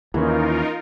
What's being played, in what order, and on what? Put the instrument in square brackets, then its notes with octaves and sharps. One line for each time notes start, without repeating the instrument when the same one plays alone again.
[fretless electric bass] D#2 [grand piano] E3 A#3 C#4 [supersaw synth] D#4 F4 A#4